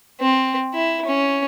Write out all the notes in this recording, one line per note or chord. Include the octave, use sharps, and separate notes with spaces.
C4
E4
C#4